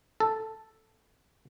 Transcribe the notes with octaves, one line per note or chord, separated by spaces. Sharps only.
A4